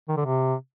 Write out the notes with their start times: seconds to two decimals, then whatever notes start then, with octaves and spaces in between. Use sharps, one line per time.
0.09 D#3
0.17 D3
0.25 C3